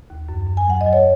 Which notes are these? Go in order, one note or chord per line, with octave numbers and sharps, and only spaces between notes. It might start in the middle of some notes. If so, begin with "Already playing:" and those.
D#2
F#2
F#2
G#5
F#3 F#5
D#5
F#3
C#5